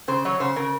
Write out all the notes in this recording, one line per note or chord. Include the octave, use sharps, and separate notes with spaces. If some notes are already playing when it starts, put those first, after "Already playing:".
C#3 C5
F#3 C#5
C#3 C5
C#3 A#4